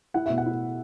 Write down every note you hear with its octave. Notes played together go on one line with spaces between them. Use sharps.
E4 F#5
B2 E5
F#5
E4